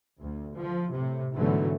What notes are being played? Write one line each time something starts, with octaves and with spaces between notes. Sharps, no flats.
D2
F3
A2 C3
G#1 B2 D3 E3 F#3 A3